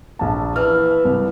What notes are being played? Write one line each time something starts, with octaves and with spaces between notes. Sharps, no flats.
A#1 A5
E3 A5 F6
C2